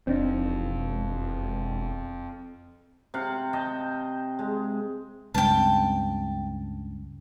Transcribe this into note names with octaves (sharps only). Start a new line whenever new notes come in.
E1 F2 C4 D4 D#4
C3 F5 F#5
D#5 G5 A5
G#3
C#2 G2 C4 G5 A5